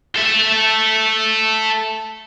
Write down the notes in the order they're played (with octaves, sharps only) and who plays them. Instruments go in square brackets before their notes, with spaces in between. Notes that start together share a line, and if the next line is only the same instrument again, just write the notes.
[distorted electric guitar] A4 E5